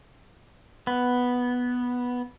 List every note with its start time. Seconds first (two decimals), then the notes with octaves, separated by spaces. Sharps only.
0.87 B3